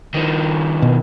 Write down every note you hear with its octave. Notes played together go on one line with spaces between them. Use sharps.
D#3 F3
B2